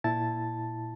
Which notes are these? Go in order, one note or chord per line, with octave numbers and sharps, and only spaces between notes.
A#2 E4 A5 A6